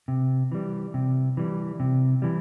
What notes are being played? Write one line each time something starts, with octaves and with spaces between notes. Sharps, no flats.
C3
E3 G3
C3
E3 G3
C3
E3 G3